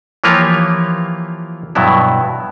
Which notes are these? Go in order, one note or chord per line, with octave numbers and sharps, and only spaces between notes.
E3 F3 A#3 F4 G4 C#5
G2 B2 F#3 B3 E4